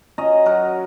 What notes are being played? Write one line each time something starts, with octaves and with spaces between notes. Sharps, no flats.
C#4 F#4 D#5 A#5
F#3 A#4 F#5